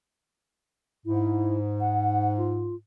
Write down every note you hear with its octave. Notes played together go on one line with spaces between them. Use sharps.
G#2 E4
F#5
F4